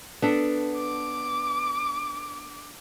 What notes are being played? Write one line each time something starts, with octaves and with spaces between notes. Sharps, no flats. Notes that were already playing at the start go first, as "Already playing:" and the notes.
B3 D4 A4
D6